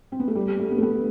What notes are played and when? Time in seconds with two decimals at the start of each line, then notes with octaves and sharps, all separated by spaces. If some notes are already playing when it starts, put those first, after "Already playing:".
0.12 C4
0.20 B3
0.28 A3
0.35 G3
0.48 G3
0.60 A3
0.71 B3
0.78 A3
0.83 B3